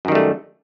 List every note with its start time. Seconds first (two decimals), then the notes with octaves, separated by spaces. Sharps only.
0.05 F#2
0.08 D#3
0.12 G3
0.15 A3